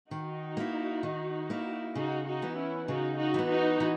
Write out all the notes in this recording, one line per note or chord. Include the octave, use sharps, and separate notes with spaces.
D#3 D#4 F#4
A#3 E4
D#3
A#3 E4
C#3 D#4 F#4
D#4 F#4
E3 B3
C#4 E4
C#3 D#4 F#4
D#4 F#4
E3 B3
D#4 F#4
E3